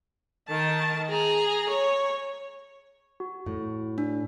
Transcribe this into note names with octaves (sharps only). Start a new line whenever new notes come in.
D#3 A5
G#4 A#5
C#5
F#4
A2
D4